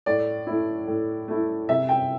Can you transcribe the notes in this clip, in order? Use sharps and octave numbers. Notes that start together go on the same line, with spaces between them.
A2 D5
A3 E4
A2
A3 E4
C3 E5
G5